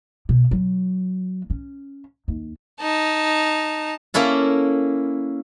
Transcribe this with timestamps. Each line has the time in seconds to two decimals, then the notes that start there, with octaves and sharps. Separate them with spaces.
0.29 B2
0.51 F#3
1.50 C#4
2.28 D#2
2.81 D#4 A5
4.14 A#3 C#4 E4 A4